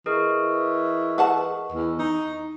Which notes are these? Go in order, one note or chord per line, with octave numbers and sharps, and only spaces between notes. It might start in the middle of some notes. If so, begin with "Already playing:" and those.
E3 G#4 A#4 D#5 C#6
B4 F#5 A5
E2
D#4